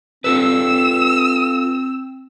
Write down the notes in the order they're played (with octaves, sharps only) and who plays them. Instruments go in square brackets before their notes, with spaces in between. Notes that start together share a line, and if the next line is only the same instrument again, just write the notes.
[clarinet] C4 [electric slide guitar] F4 A4 B4 [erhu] E6